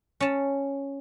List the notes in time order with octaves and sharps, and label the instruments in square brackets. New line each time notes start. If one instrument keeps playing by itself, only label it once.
[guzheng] C#4 A5